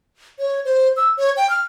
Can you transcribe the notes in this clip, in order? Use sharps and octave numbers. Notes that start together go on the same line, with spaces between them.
C#5
C5
E6
C#5
G5
F6